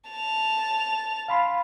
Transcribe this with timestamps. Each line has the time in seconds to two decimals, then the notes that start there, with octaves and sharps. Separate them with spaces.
0.10 A5 F7
1.28 F5 B5 C6